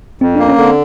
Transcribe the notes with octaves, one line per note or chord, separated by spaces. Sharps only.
F2 C4
A#3 D4
C#4
D3
C4